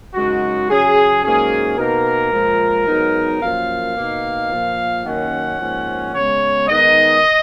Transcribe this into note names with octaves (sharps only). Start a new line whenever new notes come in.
F#2 C#3 G#3 D#4 F#4
C#3 F#3 C#4 G#4
G#2 F#3 A#3 C#4 G#4
B2 A#3 D#4 A#4
A#2 F3 G#3
G#2 F#3 B3 D#4
F#2 F3 A#3 F5
B2 A#3 D#4
A#2 F3 A#3
F#2 D#3 A#3 C#4 F#5
G#2 F3 A#3 C#4
C#3 G#3 B3 C#5
D#3 G#3 B3 D#4 D#5